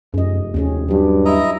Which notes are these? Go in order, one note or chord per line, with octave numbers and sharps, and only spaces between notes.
F1 F#2 G#4 D#5
D#2 C4 C#4 G#4
G2 F#3 G4
E4 D#5 A#5